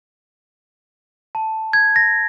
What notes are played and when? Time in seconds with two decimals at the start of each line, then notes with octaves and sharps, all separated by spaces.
1.35 A5
1.73 G#6
1.96 A#6